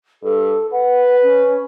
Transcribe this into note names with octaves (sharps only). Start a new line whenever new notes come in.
G2 A4
B4 F#5
C#4